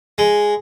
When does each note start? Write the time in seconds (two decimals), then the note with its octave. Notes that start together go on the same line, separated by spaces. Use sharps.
0.18 G#3